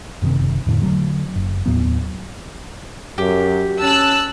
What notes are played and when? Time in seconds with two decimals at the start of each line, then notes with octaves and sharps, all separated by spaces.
0.22 F#1 C3 D#3 C4
0.66 E2 A2 D3
0.82 D3 D#3 F#3 A3
1.36 F#1
1.66 D#2 A2 F#3 B3
3.18 F#2 G4
3.81 C#4 A5 E6 F#6